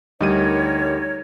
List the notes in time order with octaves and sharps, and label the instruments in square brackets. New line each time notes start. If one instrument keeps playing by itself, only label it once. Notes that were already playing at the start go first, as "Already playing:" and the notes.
[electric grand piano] D2 G3 D#7 [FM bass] D#4 [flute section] A#4 C#5